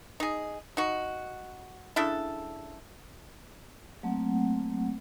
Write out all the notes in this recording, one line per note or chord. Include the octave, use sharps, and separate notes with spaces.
D#4 G#4
D#4 F#4
C#3 D4 E4 A4
F#3 A3 A#3 C4 F#5